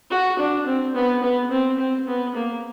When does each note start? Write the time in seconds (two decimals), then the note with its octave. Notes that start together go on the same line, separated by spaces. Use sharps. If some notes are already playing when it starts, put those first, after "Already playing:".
0.11 F#4
0.39 D4
0.67 C4
0.95 B3
1.23 B3
1.51 C4
1.79 C4
2.07 B3
2.35 A#3